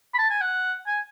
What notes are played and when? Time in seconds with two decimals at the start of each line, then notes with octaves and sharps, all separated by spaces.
0.14 B5
0.18 A5
0.30 G#5
0.41 F#5
0.86 G#5